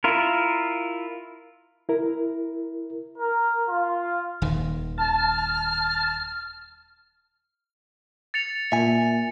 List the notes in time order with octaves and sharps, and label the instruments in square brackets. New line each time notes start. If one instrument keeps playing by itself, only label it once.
[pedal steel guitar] E4 F4 A#4
[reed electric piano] E4 A#4
[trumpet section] A#4
F4
[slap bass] D#1 D#3
[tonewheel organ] A5 [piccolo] F6
[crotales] A6 C#7 F7
[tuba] A#2 [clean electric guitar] E5 G#5